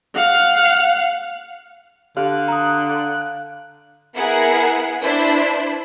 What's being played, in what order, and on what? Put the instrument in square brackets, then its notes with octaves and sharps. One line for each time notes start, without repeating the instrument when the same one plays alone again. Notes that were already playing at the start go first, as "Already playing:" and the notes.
[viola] F5 F#5
[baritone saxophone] D3 [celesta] G4 [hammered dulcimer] F5 [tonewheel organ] F#6
[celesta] A#5 D#6
[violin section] B3 E4 G#4 A#4 F#5
D4 E4 B4 C5